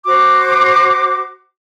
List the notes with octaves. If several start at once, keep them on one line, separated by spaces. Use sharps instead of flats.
F#4 C5 D6